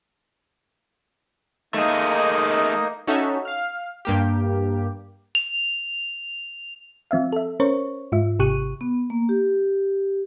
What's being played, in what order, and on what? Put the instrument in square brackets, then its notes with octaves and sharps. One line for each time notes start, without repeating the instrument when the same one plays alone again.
[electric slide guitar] A3 G#4 [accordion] A#3 D#4
[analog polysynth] C#4 D#4 F#4 A4 E5
F5 F6
G2 A#3 G4
[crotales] F7
[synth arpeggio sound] F3 C4 E5 F5
A4 E5
C#4 A#4 C5 C#5 C#6
G#2 F4 E5
G#1 C3 G4 C#6 F#6 D#7
[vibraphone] B3
A#3
G4